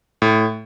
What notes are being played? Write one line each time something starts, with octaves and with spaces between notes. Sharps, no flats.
A2